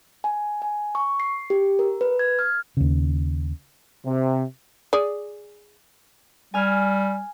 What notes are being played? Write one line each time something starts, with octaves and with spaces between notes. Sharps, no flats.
G#5
G#5
C#6
C7
G4
A#4
B4
G#6
F6
D#2 C#3
C3
G#4 D5
G3 G#5 F6